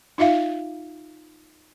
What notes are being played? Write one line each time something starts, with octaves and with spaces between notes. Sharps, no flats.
D#4 F4 E5 F5